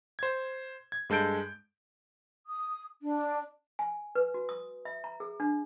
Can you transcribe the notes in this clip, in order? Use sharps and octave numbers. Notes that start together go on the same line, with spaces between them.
C5 G#6
G#6
G2 G#3 A4 G6 D7
D#6
D4
G#5
B4
F#4
D#6
E5
A#5
G#4
D4